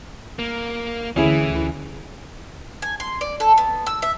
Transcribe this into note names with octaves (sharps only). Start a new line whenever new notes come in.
A#3
D2 E3 C#4 E4 G#4
G#5
C6
D5
A4
B3
E6
E5